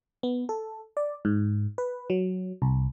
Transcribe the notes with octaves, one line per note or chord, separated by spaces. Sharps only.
B3
A4
D5
G#2
B4
F#3
C2